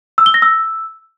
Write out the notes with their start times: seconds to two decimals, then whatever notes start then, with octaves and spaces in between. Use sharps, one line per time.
0.18 E6
0.26 G7
0.34 A#6
0.42 E6